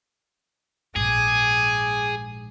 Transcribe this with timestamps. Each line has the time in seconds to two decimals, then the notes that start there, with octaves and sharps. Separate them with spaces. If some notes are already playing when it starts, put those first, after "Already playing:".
0.96 A#1 G#2 G#4 G#5 D6